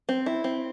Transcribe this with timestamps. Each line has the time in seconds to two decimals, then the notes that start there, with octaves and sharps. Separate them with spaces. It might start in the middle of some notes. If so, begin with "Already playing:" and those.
0.09 C4
0.26 E4
0.44 C4